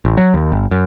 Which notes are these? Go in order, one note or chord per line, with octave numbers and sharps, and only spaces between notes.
A1
F#3
D#2
G1
F#2